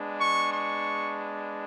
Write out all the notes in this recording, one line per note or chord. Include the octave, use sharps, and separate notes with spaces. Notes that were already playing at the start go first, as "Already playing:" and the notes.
Already playing: G#3 B3 D4
C#6
C#6